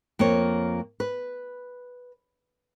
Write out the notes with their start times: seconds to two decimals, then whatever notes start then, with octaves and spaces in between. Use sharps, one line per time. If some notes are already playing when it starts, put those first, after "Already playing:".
0.19 F2 A#3 F4 C#5
1.00 B4